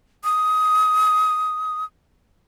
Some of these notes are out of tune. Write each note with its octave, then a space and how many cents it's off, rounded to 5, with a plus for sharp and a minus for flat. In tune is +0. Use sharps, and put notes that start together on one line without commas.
D#6 +15